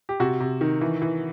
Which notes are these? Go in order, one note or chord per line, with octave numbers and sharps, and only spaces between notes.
G4
C3 F#4
C3
D#3
E3
E3